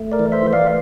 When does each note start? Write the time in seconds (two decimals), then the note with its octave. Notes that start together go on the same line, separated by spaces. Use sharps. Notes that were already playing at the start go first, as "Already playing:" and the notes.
Already playing: A3
0.12 A#4 D5
0.20 E3
0.32 C5 E5
0.46 E3
0.53 D5 F5